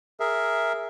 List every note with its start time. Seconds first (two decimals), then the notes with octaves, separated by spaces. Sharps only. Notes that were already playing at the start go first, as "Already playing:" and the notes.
0.20 G#4 A#4 E5